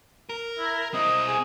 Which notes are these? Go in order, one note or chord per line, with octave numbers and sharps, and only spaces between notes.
A#4
E4
C4 E4 D#5
G#4